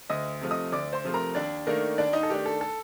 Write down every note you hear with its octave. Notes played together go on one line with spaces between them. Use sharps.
D2 D#5 D#6
C3 F3 A3
D#5 D#6
D2 D5 D6
C5 C6
C3 F3 A3
A#4 A#5
D#2 D4 D5
D#3 A3 A#3 D4 A#4
D#2 D4 D5
D#4 D#5
A4
D#3 A3 D4 G4
A4
A4